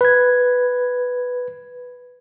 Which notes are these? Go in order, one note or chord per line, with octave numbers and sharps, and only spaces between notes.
B4 G#6